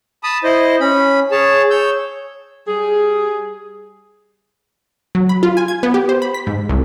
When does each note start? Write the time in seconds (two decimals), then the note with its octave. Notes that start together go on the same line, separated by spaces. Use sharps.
0.23 A5 B5 D#6
0.44 E4 C5 D#5
0.80 C#4 B5
1.31 G#4 C#5 A5
1.70 C#5 E6 G6
2.68 G3 G#4
5.15 F#3
5.29 B5
5.43 F4
5.57 G#5
5.68 G#6
5.83 B3
5.94 G4
6.09 C5
6.22 B5
6.34 B6
6.47 G#2
6.69 C2